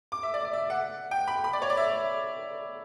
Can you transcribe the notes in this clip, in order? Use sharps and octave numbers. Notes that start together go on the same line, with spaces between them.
D6
E5
D5
D5
E5
F#5
G5
B5
B5
D5
C#5
D5
E5